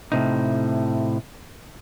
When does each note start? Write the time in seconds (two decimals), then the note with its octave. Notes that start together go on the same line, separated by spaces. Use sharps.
0.12 A2 C3 D#4